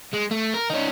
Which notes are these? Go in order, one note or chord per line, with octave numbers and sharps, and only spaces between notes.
G#3
A3
A#4
C#4 D#4